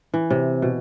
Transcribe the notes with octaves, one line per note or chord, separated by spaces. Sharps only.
E3
C3
B2